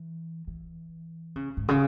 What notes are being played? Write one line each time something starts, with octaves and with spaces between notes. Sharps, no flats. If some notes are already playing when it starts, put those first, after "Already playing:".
Already playing: E3
E3
C#3
G#2
C#3